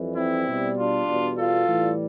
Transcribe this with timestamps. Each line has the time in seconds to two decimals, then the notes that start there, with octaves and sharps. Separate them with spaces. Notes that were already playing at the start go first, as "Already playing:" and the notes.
Already playing: F2 E3 G3
0.15 C4 E4
0.46 B2 G3
0.76 D4 F4
1.06 E2 B2 G3
1.37 F4 A4
1.67 A2 E3 G3